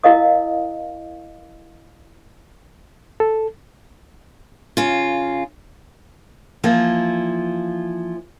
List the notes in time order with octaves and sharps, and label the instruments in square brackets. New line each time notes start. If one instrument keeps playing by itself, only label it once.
[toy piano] E4 A#4 D#5 F5 D#6
[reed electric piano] A4
[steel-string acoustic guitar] C#3 F4
[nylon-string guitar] E3 F3 A#3